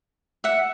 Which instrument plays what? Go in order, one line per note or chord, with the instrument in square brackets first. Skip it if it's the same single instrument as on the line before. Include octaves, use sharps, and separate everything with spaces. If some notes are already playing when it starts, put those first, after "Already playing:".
[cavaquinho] E5 F#5